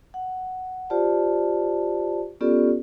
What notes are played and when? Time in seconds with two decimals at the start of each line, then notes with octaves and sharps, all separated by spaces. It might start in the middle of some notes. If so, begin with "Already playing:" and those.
0.14 F#5
0.90 F4 G4 C5 D5 A5
2.41 B3 C#4 F4 G4 A4 D5